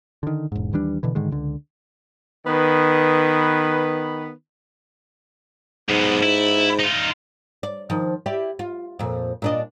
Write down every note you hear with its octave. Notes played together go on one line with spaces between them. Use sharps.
D3 D#3
E1 G#2
D#2 E3 G3 D4
B2 D3 E3
G#2 D3 D#3 G#3
C#2 D3
D#3 B3 B4
B1 G#2 B2
E4
D#4 F4
D5
D#3 F3
E4 G4 D5
F4
F2 A#2
A#2 D4 D#5